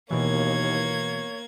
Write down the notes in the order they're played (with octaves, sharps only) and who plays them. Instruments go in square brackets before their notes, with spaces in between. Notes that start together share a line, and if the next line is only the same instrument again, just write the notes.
[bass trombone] D#2 [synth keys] B2 E3 [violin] A#3 G#6 [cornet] C#5